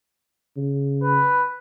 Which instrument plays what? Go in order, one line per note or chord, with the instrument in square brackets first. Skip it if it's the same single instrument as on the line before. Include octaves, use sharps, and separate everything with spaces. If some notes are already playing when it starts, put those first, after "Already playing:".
[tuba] C#3
[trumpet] B4